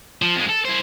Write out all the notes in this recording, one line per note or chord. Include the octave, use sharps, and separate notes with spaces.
F3
F2 G#3
A4
E4 C5